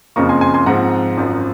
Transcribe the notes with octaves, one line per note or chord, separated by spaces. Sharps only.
F#1 F2 C#3 F3 A#3 A#5 C#6
G#5 C6
G#5 C6
G#5 C6
G#2 F3 C4 F#5 A#5
G#1 F#2 F3